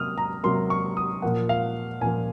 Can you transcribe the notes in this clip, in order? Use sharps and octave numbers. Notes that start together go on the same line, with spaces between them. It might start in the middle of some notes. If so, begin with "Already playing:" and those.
Already playing: C3 F#3 A#3 D#6 F6
A#5
C3 F#3 A#3 C6
C#6
D#6
A#2 F3 A#3 F#5
F5
A#2 F3 A#3 G#5